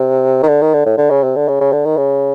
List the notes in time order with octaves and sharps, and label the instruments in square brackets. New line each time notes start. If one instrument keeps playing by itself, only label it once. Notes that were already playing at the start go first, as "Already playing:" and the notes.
Already playing: [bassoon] C3
D#3
D3
D#3
D3
A2
D3
C#3
C3
D3
C#3
C#3
D3
D#3
C#3